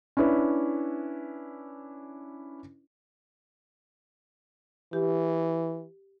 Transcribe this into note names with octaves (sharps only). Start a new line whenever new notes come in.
C#4 D4 E4 B4
E3 G4